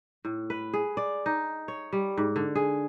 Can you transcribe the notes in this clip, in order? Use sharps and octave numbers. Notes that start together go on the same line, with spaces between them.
A2
B4
G#4
D5
D#4
C#5
G3
G#2
D3
G#4